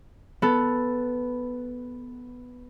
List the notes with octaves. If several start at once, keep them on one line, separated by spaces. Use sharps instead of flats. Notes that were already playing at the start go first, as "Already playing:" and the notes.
B3 A4